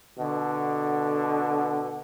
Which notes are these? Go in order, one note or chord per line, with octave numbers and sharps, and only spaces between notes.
B2 D3